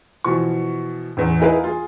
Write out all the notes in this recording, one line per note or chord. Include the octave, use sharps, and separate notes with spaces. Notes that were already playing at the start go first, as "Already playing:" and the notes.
B2 E3 F3 C#6
A1 E2
D#4 E4 G#4 A#4 B4 F5
F4 G#4